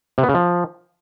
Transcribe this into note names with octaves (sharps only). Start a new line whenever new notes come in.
C3
B3
C#3
F3